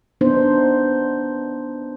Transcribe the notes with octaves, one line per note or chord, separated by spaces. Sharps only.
B3 D4 D#4 C5